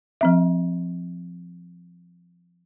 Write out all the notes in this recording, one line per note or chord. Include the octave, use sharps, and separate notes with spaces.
F3 C4 E5